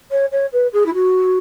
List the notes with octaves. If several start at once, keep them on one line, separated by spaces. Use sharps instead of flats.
C#5
C#5
B4
G#4
E4
F#4